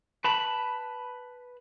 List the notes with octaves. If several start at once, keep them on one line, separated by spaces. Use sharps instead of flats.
B4 A5 B5